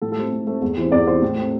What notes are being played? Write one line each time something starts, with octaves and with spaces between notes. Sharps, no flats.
A2 A4
A4
A3 C4
A2
A3 C4
E2
E3 C4
E2 D5
E3 C4 C5
A2
A3 C4